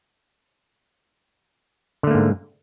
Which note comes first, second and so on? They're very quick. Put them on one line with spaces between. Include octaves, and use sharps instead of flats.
D3 A3 A#3 G#2